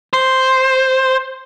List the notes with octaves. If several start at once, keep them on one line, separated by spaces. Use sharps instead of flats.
C5